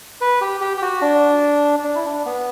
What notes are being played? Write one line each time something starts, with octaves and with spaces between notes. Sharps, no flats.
B4
G4
G4
G4
F#4
D4
D4
E4
D4
B3